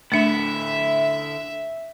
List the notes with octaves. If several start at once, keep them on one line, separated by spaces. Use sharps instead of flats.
D3 A3 D4 E4 E5